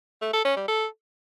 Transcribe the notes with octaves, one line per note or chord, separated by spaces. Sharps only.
A3
A4
C#4
G3
A4